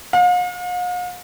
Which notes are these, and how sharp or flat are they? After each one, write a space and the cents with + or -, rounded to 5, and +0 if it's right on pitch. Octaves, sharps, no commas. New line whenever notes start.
F5 +45